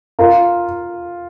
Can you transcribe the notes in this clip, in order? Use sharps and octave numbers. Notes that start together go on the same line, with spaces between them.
F4 A#4